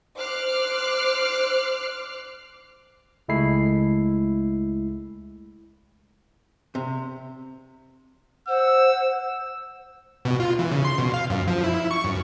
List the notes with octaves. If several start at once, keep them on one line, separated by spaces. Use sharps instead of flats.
C5 D6 F6 F#6 C7
C#2 G#3 A3 E4 C7
C3
C5 F#5 E6
B2
F4
E3
C#3
C6
B2
F5
F#2
F3
E4
C#6
F#2